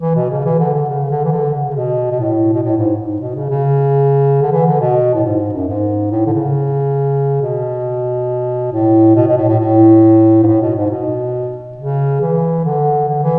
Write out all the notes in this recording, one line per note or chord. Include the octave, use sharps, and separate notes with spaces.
E3
B2
C#3
E3
D3
D3
C#3
D3
E3
D3
C#3
C#3
B2
B2
A2
B2
A2
G#2
G#2
B2
C#3
C#3
D3
E3
D3
B2
A2
G#2
F#2
G#2
A2
D3
C#3
B2
A2
B2
B2
A2
A2
A2
G#2
A2
B2
G#2
B2
C#3
E3
D3
D3
E3